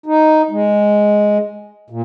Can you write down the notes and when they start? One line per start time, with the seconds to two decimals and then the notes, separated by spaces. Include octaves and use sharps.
0.06 D#4
0.51 G#3
1.90 A#2